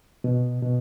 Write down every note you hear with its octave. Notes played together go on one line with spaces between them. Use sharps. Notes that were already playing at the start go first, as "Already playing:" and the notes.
B2
B2